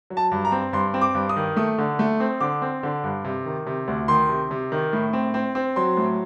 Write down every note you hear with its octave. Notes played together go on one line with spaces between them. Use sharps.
F#3
A5
G2
A#5
C4
G2 C6
C4
D6
G2
D#6
D#3
A3 D#6
D3
A3
C4
D3 D6
C4
D3
G2
C3
D#3
C3
D2
D#3 C6
C3
C3
D#3
A2
C4
C4
C4
F#3 C6
A2